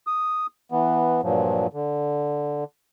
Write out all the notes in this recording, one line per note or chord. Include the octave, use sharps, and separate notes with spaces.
D#6
E3 B3
G2 A#2 F3 F#3
D3